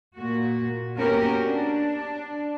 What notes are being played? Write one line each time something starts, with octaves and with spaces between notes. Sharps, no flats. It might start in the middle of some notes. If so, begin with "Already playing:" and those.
A#2 F#4
A#3 B3 C#4 F#4 G4 A#4
D4